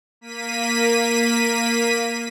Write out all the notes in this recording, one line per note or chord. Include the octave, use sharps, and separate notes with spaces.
A#3 B6 D#7